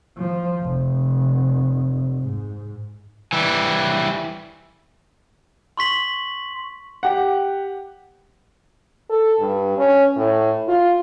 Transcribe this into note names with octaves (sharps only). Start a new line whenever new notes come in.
F3
F1
G#2
E3 G3
C6 C#6 B6 F#7
G4 F#5
A4
G2
C#4
A2
F4